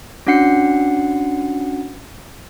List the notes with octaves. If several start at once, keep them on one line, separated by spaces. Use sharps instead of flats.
C#4 D4 F#4 F#5 C7 C#7